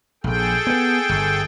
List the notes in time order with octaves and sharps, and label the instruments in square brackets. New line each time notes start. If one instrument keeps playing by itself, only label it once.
[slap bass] A#1 [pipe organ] G#4 A4 G5
[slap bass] B3
G1